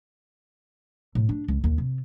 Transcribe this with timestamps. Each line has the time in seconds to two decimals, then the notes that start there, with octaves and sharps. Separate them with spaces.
1.15 A2
1.29 D4
1.48 C#2
1.64 D#2
1.78 C3